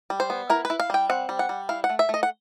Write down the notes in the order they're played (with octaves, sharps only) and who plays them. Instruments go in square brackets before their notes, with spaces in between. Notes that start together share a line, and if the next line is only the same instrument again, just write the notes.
[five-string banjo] G3
C5
B3
E4 A#4
B4
E4
F5
G3 G5
C4 F#5
G3
F#5
G3
E4 F5
F#5
A3
E5
A3 D#5
F#5